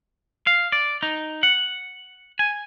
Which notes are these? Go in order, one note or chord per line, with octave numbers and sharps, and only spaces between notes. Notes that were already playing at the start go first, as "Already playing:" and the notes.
F5
D5
D#4
F#5
G#5